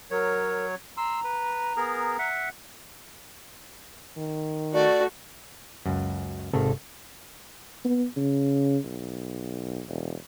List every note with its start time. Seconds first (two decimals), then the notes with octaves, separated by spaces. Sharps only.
0.11 F#3 A#4 C#5
0.97 A#5 C6 E6
1.24 B4
1.77 B3 G#4 A#4
2.19 E5 F#5
4.17 D#3
4.73 A3 F#4 D5
5.86 C#2 F#2
6.53 G#1 C3 D#3 A4
7.85 B3
8.17 C#3
8.85 B1
9.88 E1